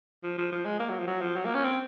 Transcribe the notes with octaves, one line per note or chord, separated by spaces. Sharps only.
F3
F3
F3
G#3
A#3
F#3
F3
F#3
F3
F#3
A#3
C#4
C4